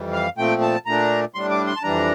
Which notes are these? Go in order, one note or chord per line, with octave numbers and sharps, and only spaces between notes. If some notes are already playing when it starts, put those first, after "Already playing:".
Already playing: F2 E3 G3
F5
A#2 F3 A3 C4 G5
A5
A#2 A3 D4 A#5
A2 G3 D4 C6
D6
C6
A5
F2 E3 G3 D4 A#5